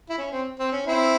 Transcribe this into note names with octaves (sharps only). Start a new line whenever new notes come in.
E4
C#4
C4
C4
C#4
C4 E4